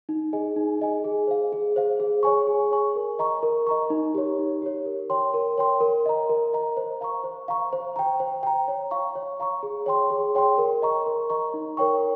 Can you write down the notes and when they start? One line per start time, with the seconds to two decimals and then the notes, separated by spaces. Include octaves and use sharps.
0.09 D#4
0.33 G#4 D#5 G#5
0.56 D#4
0.80 G#4 D#5 G#5
1.04 G#4
1.27 C5 F5
1.52 G#4
1.76 C5 F5
2.00 G#4
2.23 C#5 G#5 C#6
2.47 G#4
2.71 C#5 G#5 C#6
2.96 A#4
3.19 D#5 A#5 C#6
3.43 A#4
3.67 D#5 A#5 C#6
3.90 D#4
4.15 G4 C#5
4.39 D#4
4.62 G4 C#5
4.86 A#4
5.10 C#5 G5 C6
5.34 A#4
5.58 C#5 G5 C6
5.81 A#4
6.06 D#5 A#5
6.30 A#4
6.53 D#5 A#5
6.77 C5
7.01 F5 A#5 C#6
7.24 C5
7.48 F5 A#5 C#6
7.73 C5
7.96 G5 A#5
8.20 C5
8.43 G5 A#5
8.68 C#5
8.91 F5 A#5 C#6
9.15 C#5
9.40 F5 A#5 C#6
9.63 G#4
9.86 C#5 G5 C6
10.10 G#4
10.35 C#5 G5 C6
10.58 A#4
10.82 D#5 A#5 C#6
11.06 A#4
11.30 D#5 A#5 C#6
11.54 D#4
11.77 A#4 C#5 G5 C#6